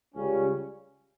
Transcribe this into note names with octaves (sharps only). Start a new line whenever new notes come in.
C#2 C#3 G3 C#4